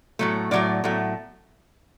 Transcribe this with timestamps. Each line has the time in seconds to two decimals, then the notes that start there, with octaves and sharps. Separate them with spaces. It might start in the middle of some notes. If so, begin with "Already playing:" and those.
0.19 A2 F#3 A3
0.51 A2 F#3 A3 D5
0.84 A2 F#3 A3